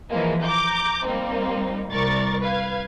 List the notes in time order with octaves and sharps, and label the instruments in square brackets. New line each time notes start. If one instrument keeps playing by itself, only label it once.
[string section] E3 F3 G#3 A#3
A#5 D6 G6
G3 A#3 C4 D#4
C2 A#4 D5 C#6 A6
B4 F5 G#6